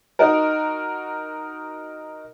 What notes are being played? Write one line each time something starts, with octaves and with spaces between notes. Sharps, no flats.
D#4 F#4 A#4